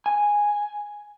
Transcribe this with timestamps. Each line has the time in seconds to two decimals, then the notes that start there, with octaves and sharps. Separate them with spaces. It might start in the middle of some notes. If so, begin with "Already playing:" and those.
0.06 G#5